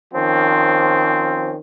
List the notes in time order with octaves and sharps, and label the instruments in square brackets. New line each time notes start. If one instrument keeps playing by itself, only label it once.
[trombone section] D#3 F3 C4 C#4